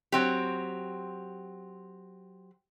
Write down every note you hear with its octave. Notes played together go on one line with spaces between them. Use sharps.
F#3 C4 G4